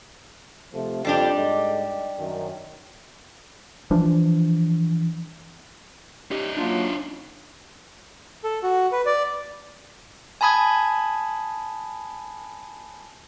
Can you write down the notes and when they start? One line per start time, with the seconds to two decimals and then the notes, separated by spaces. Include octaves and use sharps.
0.73 C3 F3 A3
1.05 F2 G3 D4 G4
1.35 G#2 A4 D#5
2.18 F#2 D#3
3.91 E3 F3 D4
6.31 C#4 D#4 G4
6.57 F#3 A#3 D4 F4
8.44 A4
8.63 F#4
8.92 B4
9.06 D5
10.41 G#5 A5 B5 D#6 G#6